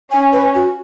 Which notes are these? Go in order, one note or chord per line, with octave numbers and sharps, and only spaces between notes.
C#4 G#5
B4
F#4